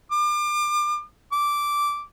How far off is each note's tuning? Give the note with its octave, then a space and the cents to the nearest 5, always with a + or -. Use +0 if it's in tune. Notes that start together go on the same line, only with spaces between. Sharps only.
D6 +35
D6 -10